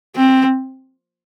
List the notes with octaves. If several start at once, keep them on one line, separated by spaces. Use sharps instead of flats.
C4